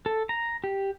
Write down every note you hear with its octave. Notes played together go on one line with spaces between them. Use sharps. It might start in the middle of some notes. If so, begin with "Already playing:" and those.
A4
A#5
G4